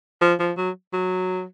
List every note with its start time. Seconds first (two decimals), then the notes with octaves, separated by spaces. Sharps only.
0.21 F3
0.39 F3
0.57 F#3
0.93 F#3